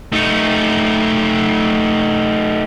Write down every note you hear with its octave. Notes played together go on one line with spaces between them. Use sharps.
A3 D#4